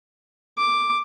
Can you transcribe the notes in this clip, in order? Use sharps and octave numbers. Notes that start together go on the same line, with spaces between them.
D6